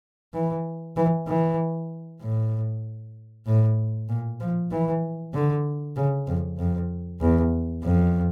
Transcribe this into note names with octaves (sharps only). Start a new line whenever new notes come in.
E3
E3
E3
A2
A2
A#2
F3
E3
D3
C#3
F2
F2
E2
F2